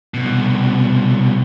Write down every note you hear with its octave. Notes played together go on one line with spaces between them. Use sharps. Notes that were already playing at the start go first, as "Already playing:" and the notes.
C2 B2